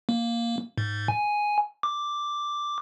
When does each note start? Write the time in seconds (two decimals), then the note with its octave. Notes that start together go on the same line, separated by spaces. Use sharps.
0.09 A#3
0.78 G#2
1.08 G#5
1.83 D6